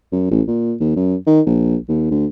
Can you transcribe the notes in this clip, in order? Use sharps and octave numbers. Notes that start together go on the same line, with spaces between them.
F#2
A1
A#2
D#2
F#2
D#3
A#1
D#2
D2